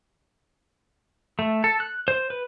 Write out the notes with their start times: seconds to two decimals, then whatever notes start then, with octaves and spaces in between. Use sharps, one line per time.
1.39 A3
1.64 A4
1.80 F#6
2.08 C5
2.30 B4